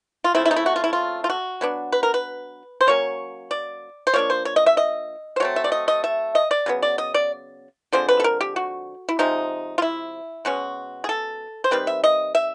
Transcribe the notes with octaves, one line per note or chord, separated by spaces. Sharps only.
F4
C#3 F3 A3 C4 E4
E4
D#4
E4
F#4
F4
E4
F4
F4
F#4
F#3 B3 D4
B4
A#4
B4
C5
F#3 A#3 C#4 C#5
D5
C5
F3 A#3 D4 C#5
C5
C#5
D#5
E5
D#5
C5
F#3 A3 C4 C#5
E5
D5
D#5
D#5
E5
D#5
D5
C#3 F#3 B3
D5
D#5
D5
D3 F3 G#3 C4 C5
B4
A4
A#4
G4
F#4
E4
C3 F3 G#3 D#4
F4
E4
B2 G#3 C#4 F#4
G#4
A4
C5
D#3 G3 C4 B4
E5
D#5
E5